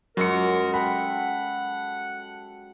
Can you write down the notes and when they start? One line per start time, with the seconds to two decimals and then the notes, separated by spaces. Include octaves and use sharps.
0.17 F#2 F#3 G#3 F#4 A#4 C#7
0.74 A4 F#5 G5 B5